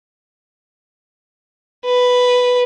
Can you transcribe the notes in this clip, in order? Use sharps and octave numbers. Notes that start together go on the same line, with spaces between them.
B4